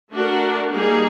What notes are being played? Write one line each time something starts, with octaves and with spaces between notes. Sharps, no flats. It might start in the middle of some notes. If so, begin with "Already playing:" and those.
A3 D4 F#4 A#4
G3 A#3 D#4 G#4